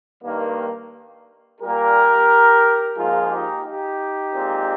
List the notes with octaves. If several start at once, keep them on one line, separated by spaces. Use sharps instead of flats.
G2 D#3 A#3
A#2 G3 A#3 G4 A#4
G#2 F3 A#3 F4 G#4
D#4 G4
D#4 G4
A#2 G#3 C4